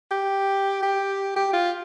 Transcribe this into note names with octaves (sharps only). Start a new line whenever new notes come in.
G4
G4
G4
F4